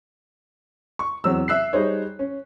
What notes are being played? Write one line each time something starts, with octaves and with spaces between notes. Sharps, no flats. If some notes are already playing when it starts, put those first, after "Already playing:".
C#6
E2 F#3 C4 E6
E5 E6 F#6 C7
G3 D#4 G#4 C5 C#5
C#4